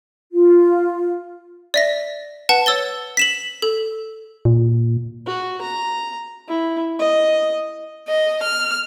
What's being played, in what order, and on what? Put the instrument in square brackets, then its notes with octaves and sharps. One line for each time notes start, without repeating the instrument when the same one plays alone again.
[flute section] F4
[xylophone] D5 E5 A#6
B4 F#5 A5
C#5 E6 A6 G7
B6 E7 F#7
A4
[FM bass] A#2
[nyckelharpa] F#4
A#5
E4
D#5
[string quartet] D#5
F6